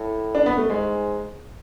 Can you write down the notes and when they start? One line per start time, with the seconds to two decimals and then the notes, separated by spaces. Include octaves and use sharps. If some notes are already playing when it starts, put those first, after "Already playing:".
Already playing: A2
0.35 D4
0.46 B3
0.57 A3
0.69 G#2 G#3